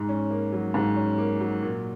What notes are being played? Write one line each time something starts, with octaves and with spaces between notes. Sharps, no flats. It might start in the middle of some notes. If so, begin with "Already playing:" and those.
Already playing: G#2
C#4
A#3
F#3
G#2
C#4
A#3
F#3
A#2